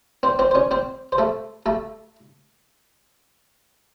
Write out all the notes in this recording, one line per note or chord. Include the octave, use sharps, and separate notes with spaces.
C4 C5
C4 C5
C5
C#4 C#5
C4 C5
C5
A3 A4
A3 A4